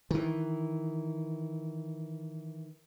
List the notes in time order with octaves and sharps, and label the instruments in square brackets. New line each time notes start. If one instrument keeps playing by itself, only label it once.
[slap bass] D#3 E3